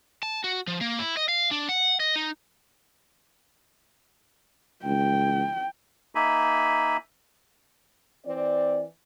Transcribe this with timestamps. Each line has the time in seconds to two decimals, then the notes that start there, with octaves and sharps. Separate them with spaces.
0.23 A5
0.44 F#4
0.67 F3
0.81 A#3
0.99 E4
1.17 D#5
1.29 F5
1.51 D4
1.69 F#5
2.00 D#5
2.16 D#4
4.85 C#2 G5
6.15 A#3 D#4 E5 G#5 B5
8.26 E3 C4 D5